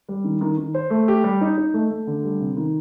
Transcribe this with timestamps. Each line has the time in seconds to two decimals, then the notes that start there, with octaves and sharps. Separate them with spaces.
0.08 G3
0.24 D#3
0.41 D#3
0.57 D#3
0.74 C5
0.90 A3
1.08 G4
1.24 G3
1.41 D#4
1.58 D#4
1.74 A3
1.90 A3
2.07 D3
2.24 G3
2.40 C3
2.57 D#3